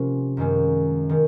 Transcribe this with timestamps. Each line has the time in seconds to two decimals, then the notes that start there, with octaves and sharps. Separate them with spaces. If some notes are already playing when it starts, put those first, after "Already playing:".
Already playing: C3 F3 A#3 C#4
0.37 F#2 D#3 G#3 C#4
1.09 D#3 G#3 C#4